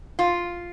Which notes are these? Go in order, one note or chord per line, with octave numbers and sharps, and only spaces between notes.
F4